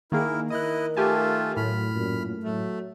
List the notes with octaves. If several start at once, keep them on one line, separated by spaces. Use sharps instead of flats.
D#3 A#3 E4 G#4 A#4
D#3 E4 A#4 D#5 D#6 F#6
A3 F4 G4 G#5 A5
A2 F#3 B5 F6
F#2 A#2
F#3 A3